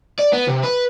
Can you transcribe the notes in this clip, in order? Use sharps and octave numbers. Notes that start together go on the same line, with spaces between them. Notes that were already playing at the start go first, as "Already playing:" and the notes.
D5
B3
C3
B4